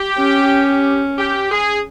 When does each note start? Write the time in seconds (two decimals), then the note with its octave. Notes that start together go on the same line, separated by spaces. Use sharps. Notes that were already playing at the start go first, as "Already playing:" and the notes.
Already playing: G4
0.18 C#4
1.18 G4
1.51 G#4